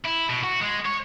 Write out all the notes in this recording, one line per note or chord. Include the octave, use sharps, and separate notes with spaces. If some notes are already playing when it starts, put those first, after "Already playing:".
E4
B2
F#4
G#3
C#5